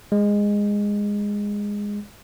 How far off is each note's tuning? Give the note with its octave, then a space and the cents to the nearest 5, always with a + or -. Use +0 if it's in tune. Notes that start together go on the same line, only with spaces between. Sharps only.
G#3 -15